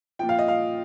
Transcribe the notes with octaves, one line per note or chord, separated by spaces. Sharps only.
A#2 F3 G5
F5
D#5
F5